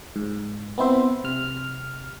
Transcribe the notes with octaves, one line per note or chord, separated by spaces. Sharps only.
G#2
B3 C4 E4 C5 E5
C3 F6